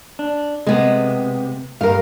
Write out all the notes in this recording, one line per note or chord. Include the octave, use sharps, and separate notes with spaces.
D4
C3 G#3 B3
G2 G3 A#4 F5